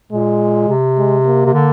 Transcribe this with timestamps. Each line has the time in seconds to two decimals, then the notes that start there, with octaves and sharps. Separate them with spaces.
0.12 A#2 G#3
0.68 C3
0.98 G#3
1.26 A#3
1.45 C3
1.54 D3